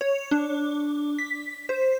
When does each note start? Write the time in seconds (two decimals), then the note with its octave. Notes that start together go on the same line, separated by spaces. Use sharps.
0.01 C#5
0.31 D4
1.19 B6
1.69 C5